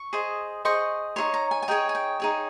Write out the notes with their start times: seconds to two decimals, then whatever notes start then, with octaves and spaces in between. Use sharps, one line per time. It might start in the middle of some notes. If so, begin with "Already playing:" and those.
Already playing: C#6
0.13 G#4 C5 D#5
0.65 G#4 C5 D#5 C#6
1.16 D#4 G#4 C#5 C6
1.34 A#5
1.51 G#5
1.62 G#5
1.68 D#4 G#4 C#5 G5
1.89 G#5
1.95 G5
2.20 D#4 G#4 C#5